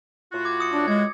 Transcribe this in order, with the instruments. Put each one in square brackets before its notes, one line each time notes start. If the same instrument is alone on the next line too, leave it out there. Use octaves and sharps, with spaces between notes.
[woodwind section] A2 F4 F#4
[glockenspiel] D6 G#6
D#6 C#7
[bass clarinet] D4 [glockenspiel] D#6
[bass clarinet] G#3 [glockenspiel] G#6